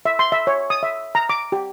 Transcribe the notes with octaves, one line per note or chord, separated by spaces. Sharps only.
E5
C6
E5
C#5
D#6
E5
A#5
D6
G4